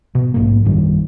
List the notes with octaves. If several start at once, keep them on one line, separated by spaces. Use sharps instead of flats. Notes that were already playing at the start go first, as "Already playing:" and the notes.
B2
A#1 G#2 A#3
A#1 F#2 D#3 G3